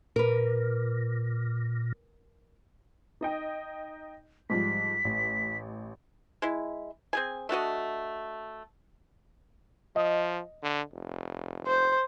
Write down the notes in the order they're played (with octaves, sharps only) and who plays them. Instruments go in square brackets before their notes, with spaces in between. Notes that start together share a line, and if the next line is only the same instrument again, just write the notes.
[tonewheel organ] A#2 [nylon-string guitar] A#4 B4
[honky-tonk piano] D#4 D#5 G5
[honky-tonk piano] G#2 F3 G3 [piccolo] B6
[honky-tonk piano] A1
[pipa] G#3 E4
C4 G#4 G#5
A3 D4 F#4 D#5
[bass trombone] F3 [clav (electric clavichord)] D#5
[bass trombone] D3
F1
[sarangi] C5